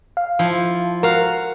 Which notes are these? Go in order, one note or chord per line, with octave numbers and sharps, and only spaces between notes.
F5
F3 E4
F#4 A#4 F5